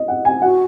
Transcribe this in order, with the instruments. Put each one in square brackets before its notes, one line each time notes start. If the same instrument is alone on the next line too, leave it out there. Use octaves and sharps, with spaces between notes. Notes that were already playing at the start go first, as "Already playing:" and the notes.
Already playing: [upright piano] D#5
F#5
G#5
[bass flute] F#4 [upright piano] F#5